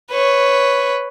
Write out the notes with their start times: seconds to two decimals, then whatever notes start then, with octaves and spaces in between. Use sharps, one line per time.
0.11 B4 C#5